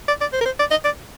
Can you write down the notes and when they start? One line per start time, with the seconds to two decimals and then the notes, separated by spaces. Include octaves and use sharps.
0.08 D5
0.21 D5
0.33 C5
0.41 A#4
0.46 C5
0.59 D5
0.71 D#5
0.85 D5